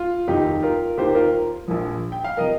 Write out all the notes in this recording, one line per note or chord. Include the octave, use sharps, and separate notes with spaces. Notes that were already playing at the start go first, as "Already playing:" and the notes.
Already playing: F4
F1 D#2 D#3 D#4 G4
F4 A#4
D#2 D#3 G4 C5
F4 A#4
A#1 A#2 F3
G5
F5
C3 F3 A#4 D#5